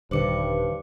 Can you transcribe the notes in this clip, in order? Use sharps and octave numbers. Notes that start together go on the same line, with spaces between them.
D#1 G2 D3 D#3 C5 D6 C#7